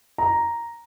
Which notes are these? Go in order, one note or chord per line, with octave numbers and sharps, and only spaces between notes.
A#5